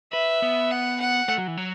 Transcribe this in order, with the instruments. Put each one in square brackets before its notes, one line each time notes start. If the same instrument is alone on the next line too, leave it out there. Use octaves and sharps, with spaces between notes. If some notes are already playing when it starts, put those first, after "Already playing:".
[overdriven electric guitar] B4 [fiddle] E5
[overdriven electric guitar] B3
[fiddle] F#5
F#5
[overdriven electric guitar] A3
F#3
E3
F#3